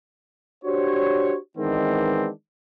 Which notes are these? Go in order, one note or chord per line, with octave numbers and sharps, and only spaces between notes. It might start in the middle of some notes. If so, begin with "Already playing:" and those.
D4 F#4 G4 C5 C#5
D#3 E3 G#3 B3 C4 D4